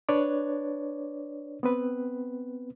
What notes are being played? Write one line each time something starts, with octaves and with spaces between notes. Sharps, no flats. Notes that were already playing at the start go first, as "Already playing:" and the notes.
D4 B4 C#5 D5
B3 C4 B4